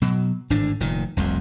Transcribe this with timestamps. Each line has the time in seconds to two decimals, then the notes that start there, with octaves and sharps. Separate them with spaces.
0.02 B2 F#3
0.50 G#1 A2 D3 D4
0.80 F1 A#2 D#3
1.17 F1 C2 F2